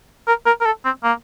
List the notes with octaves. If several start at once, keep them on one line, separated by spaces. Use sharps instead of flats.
A#4
A#4
A#4
A4
C4
A#3